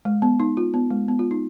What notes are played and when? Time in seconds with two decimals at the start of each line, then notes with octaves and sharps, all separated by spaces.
0.05 G#3
0.22 B3
0.40 D#4
0.57 F4
0.74 B3
0.90 G#3
1.08 B3
1.19 F4
1.31 D#4